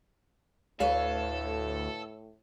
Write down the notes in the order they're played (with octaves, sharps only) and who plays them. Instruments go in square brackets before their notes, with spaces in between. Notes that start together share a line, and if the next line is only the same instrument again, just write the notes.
[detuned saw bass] D2 [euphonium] A2 [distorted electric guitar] A4 [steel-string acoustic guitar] B4 C#5 F5